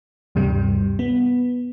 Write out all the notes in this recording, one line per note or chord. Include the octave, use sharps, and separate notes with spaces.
D2 G2 C3 G3
B3